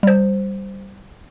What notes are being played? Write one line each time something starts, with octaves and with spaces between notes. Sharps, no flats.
G3 C5